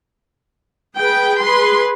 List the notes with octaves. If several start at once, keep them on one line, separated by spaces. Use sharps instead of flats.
G#4 B4 G5
G#4 B4 C6